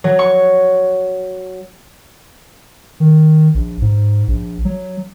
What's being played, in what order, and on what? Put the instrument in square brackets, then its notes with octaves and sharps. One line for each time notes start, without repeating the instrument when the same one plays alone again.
[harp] F#3
C#6
[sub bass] D#3
A#1
G#2
A#1
F#3